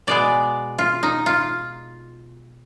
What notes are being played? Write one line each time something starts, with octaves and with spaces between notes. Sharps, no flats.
B2 G#3 B3 D5
F4
D#4
F4